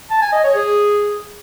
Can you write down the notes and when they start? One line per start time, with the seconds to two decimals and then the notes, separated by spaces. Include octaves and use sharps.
0.11 A5
0.22 G#5
0.33 D#5
0.44 C#5
0.55 G#4